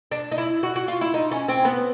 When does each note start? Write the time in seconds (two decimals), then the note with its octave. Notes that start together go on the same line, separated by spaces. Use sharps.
0.12 D4
0.32 D#4
0.38 E4
0.63 F#4
0.76 F#4
0.88 F4
1.01 E4
1.14 D#4
1.31 C#4
1.48 C4
1.65 B3